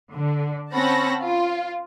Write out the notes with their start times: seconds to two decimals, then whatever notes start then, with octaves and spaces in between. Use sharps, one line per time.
0.13 D3
0.73 C4 C#4 F#5 A5 B5 A#6
1.24 F4